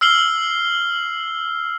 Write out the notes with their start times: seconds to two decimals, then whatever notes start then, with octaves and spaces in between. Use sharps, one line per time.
0.01 E6 F6 C7 F#7 G7